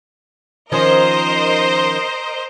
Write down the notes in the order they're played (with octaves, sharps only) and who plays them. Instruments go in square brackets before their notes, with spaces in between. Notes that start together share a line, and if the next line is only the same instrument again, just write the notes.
[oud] D#3 F3 C#4 [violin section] A#4 C5 D#5